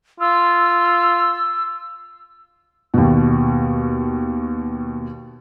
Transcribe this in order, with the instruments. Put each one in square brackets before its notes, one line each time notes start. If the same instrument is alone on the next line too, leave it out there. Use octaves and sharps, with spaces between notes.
[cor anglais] F4 [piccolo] E6
[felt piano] D#2 B2